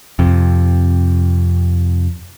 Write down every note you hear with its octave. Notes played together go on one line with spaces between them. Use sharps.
F2 C3